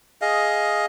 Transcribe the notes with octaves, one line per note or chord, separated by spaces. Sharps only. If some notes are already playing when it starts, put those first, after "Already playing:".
G#4 D#5 F5